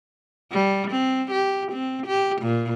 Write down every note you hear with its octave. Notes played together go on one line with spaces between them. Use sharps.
G3
C4
G4
C4
G4
A#2